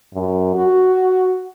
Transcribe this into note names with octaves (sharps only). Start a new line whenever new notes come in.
F#2
F#4